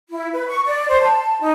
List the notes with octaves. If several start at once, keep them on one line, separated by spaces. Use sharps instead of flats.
E4
B4
C#6
D5
C5
A5
D#4